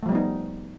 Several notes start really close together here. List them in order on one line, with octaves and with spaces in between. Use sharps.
A3 F3 G3 B3 D#4